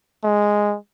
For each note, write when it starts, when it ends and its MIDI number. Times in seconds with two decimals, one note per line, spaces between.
0.24 0.77 56